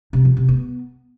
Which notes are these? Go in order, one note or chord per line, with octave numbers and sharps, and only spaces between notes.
C3
F3
C3
B3